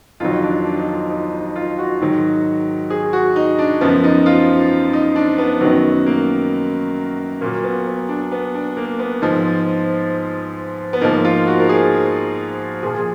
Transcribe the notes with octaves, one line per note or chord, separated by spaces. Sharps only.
F2 D#3 F#3 F4
D4
D4
D#4
F4
D#4
D#4
F4
F#4
G#2 D#3 F#3
G#4
F#4
D#4
D4
F#2 F3 B3
D#4
F4
D#4
D4
B3
F#2 D#3 F#3 B3
A#3
A#2 F#3 A#3
B3
B3
D4
B3
D4
A#3
B3
G#2 F3
B3
G#2 F3 A#3
F4
F#4
A#4
G#4
A#2 F3 G#4
G#4